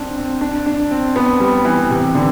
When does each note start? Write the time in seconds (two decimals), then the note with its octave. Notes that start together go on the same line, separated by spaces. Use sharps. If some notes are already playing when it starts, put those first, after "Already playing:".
Already playing: C4 D4
0.16 C4
0.41 D4
0.66 D4
0.91 C4
1.16 B3
1.40 G3
1.65 E3
1.90 C3
2.15 D3